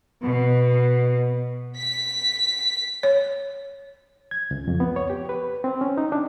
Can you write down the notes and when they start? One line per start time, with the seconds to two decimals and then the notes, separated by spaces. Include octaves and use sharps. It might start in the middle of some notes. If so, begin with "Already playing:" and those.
0.23 B2
1.76 B6
3.03 C#5
4.31 G#6
4.51 C#2
4.68 F2
4.80 B3
4.96 C#5
5.10 G4
5.29 B4
5.64 C4
5.81 C#4
5.98 D#4
6.12 D4